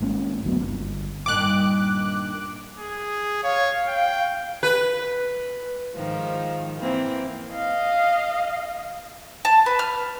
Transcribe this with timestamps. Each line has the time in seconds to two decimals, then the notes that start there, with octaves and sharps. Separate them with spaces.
0.01 G#1 G#3 A#3 C#4
0.43 F#1 D2 F#3 B3
0.60 G1
1.26 G2 A#2 D#3 D6 F#6
2.79 G#4
3.43 C#5 F5
3.88 G5
4.63 B4
5.95 G#2 D#3 F3
6.80 E3 A#3 C4
7.52 D#5 F5
9.45 A5
9.66 B4
9.79 F6